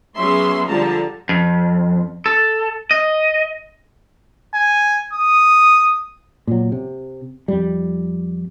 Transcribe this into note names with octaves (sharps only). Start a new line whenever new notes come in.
F#3 B3 C#4 G#4 E5 C6
D3 F3 G3 A5 A#5
F2
A4
D#5
G#5
D#6
A#2 F#3
C3
F2 G3